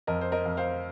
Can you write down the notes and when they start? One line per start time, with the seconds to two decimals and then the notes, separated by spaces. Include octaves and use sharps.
0.07 F2 A#4 D#5
0.21 C5
0.32 A#4 D#5
0.45 F2
0.57 C5 F5